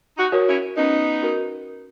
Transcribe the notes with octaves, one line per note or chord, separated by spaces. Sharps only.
D#4 F#4
F#4 A#4 C#5
C#4 E4
B3 C#4 D#4
F#4 A#4